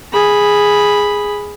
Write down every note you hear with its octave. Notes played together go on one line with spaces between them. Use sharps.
G#4 B5